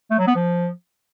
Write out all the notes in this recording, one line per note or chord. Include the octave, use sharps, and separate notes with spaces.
A3
F#3
B3
F3